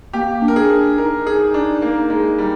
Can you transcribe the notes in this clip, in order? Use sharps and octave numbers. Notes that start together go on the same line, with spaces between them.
A#3 G4
D4
A#4
G#4
D4
D#4 A#4
G#4
D4
A#3
G#3
G3